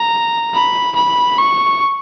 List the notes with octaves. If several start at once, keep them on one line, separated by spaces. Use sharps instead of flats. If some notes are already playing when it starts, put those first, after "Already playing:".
Already playing: A#5
B5
B5
C#6